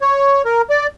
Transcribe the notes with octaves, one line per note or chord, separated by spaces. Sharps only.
C#5
A#4
D5